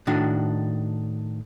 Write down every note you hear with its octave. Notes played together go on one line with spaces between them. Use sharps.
A2 D#3 D4 F#4